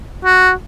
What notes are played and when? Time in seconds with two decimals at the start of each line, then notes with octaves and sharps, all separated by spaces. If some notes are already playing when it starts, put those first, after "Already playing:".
0.25 F#4